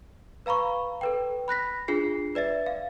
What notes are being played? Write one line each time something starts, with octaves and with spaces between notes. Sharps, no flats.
B4 F5 A#5 B5 C#6
A4 B4 G5
B5 F#6 A#6 B6
D4 F4 G#4 C7
B4 D5 E5 A6
F5